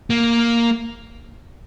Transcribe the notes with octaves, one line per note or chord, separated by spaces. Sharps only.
A#3